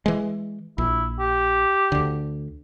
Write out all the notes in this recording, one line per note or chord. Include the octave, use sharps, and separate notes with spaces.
E3 G#3
A#1 E4
G4
D2 D3